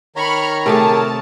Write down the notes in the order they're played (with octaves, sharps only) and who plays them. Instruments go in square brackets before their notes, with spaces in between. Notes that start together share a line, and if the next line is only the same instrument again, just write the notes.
[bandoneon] D#3 C#5 A#5 [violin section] B5 C#6 F6
[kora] C3 A3 G#4 [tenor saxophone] A#4 [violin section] A5